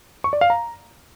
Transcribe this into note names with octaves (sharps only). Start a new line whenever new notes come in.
C#6
D5
F5
A#5